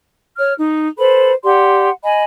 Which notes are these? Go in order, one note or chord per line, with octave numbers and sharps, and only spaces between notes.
C#5 F6
D#4
A4 B4 C5 B5
G4 D5 F#5 C6
D#5 G#5 B5